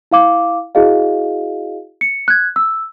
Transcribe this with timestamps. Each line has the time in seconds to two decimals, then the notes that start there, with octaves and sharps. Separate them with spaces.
0.11 E4 F5 D6
0.75 E4 F#4 G#4 D#5 F5
2.01 C#7
2.28 F#6 G#6
2.56 E6